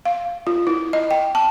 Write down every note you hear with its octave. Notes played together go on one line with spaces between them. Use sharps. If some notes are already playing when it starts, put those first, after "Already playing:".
F5
F4
E4
D#5
G5
A5